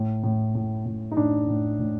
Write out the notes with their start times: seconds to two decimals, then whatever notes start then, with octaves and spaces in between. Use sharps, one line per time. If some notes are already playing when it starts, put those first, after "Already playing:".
Already playing: A2
0.23 A2
0.55 A2
0.86 A2
1.11 D#4
1.17 A2 D4
1.48 A2
1.79 A2